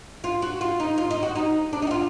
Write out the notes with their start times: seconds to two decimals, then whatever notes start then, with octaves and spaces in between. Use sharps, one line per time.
0.24 F4
0.42 F#4
0.61 F4
0.80 D#4
0.98 F4
1.11 D#4
1.22 F#4
1.35 D#4
1.73 D4
1.82 D#4
1.87 F#4
1.91 F4